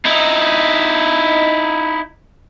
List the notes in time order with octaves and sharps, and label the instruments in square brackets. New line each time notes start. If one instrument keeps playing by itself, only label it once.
[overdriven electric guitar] D#4 E4